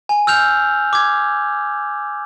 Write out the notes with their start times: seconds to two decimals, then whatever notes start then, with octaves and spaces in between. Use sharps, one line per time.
0.09 G#5
0.27 E6 F6 G6 F7
0.93 D6 G#6